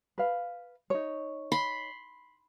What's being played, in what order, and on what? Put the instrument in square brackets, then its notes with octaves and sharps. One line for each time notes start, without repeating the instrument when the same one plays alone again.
[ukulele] B4 F5
D#4 C#5
[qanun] B5 C6